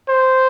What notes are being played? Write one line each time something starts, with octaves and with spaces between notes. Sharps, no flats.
C5